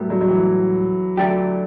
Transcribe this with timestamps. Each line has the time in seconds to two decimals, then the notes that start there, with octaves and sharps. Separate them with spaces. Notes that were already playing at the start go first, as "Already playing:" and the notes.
Already playing: A2 F#3 G3 A3 B3
0.10 F#3
0.21 F#3
0.28 E3
1.17 D3 F#3 A3 D4 G4